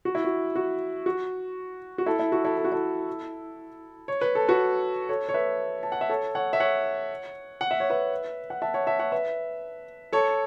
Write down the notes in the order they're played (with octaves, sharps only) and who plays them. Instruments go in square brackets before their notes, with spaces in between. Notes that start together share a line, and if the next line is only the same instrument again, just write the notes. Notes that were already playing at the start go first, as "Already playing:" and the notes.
[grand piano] F#4
E4
F#4
F#4
F#4
F#4
E4 A4
E4
F#4
E4 A4
A4
F#4
E4 A4
C#5
B4
A4
F#4 B4
A4 C#5
C#5
B4 E5
A5
F#5
E5
A4 C#5
C#5 F#5
E5
C#5 F#5
F#5
E5
C#5
B4 E5
F#5
E5 A5
C#5 F#5
E5 A5
C#5 F#5
B4 E5
A4 C#5